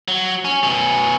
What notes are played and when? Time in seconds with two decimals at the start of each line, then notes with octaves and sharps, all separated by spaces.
0.08 F#3
0.45 C#4
0.63 B2 C#4